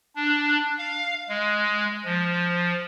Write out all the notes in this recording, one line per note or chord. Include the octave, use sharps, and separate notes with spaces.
D4
F5
G#3
F3